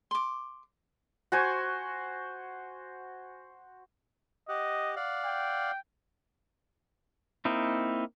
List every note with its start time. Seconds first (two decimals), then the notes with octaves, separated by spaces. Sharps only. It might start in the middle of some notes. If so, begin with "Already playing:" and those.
0.11 C6 D6
1.32 F#4 C5 G#5 C#6
4.49 G4 D#5 F#5
4.96 D5 F5 F#5
5.25 G5
7.45 A#3 C4 D#4 E4